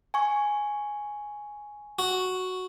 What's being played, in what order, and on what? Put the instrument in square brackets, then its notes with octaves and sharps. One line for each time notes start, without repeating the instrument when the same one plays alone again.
[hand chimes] G#5 C#6
[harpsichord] F#4